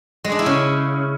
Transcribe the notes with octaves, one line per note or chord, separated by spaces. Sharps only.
G#3
D4
E4
C#3